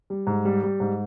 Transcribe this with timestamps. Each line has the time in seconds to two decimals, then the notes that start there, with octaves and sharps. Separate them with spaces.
0.10 G3
0.27 G#2
0.45 G3
0.63 G3
0.80 G#2